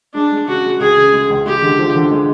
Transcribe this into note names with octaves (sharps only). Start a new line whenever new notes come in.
G#3 D4
G#3
C#3 F#4
G#3
C#2 G#4
C#3
G#3
C#2
G#3 G4
D3
F3
D3
G#3